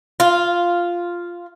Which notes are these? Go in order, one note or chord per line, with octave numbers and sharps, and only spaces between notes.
F4